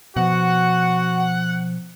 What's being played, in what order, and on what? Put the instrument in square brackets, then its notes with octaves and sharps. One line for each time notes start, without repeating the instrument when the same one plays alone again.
[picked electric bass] B2 [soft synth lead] F3 [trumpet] F#4 [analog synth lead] F#5